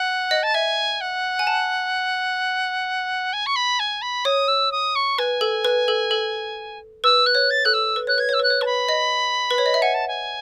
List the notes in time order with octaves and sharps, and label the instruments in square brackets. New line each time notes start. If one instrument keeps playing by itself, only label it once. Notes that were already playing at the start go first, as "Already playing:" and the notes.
Already playing: [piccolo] F#5
[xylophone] D#5
[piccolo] A5
[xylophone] E5 [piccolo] G#5
[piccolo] F#5
[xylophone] G#5
A5
[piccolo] G#5
C#6
B5
G#5
B5
[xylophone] C#5 [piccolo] D#6
[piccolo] E6
D#6
C#6
[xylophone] B4 [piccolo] G#5
[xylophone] A4
B4
A4
A4
[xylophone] B4 [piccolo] E6
[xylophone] B4 [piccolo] F#6
[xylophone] C#5
[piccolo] A6
[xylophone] A4 [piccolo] F#6
[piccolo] E6
[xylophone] B4
[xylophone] C#5 [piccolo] F#6
[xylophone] B4 [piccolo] G#6
[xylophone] C#5 [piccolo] E6
[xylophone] B4 [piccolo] F#6
[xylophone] C#5
[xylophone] B4 [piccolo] A5
[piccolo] B5
[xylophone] D#5
B4
C#5
D#5
E5
[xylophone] F#5 [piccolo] G#5
[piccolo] A5
G#5